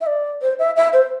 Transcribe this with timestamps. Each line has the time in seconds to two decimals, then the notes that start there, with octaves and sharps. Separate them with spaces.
0.01 E5
0.07 D5
0.42 C5
0.59 E5
0.76 E5
0.93 C5